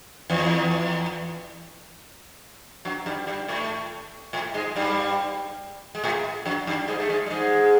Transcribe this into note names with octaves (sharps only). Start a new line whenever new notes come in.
E2 E3
F#2 F#3
G2 G3
G2 G3
A2 A3
A2 A3
G#2 G#3
G2 G3
G#3
A2 A3
F#2 F#3
G2 G3
G#2 G#3
A3
G#2 G#3
G3
G#2 G#3